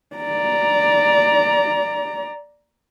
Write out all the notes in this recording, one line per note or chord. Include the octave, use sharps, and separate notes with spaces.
D5 A#5